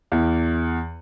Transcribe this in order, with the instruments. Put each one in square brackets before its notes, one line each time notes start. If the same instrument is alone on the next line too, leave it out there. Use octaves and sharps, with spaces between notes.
[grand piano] E2